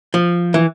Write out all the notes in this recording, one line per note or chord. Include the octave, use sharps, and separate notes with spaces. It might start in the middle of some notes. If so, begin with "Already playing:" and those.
F3
E3